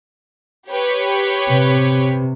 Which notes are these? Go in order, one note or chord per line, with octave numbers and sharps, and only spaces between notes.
G4 B4 C#5
C3